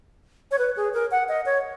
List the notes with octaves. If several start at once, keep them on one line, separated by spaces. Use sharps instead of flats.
C#5
B4
G#4
A#4
F#5
D#5
C#5